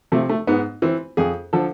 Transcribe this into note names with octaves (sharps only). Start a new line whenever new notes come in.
C3 F3 A3
A3
G#2 B3
E3 C4
F2 G#4
D3 F3 A4